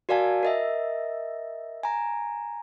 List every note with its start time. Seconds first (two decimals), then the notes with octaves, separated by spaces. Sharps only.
0.09 F#4 A#4 D5 F5 G#5 A5
0.43 A#4 D#5 E5
1.83 G#5 A#5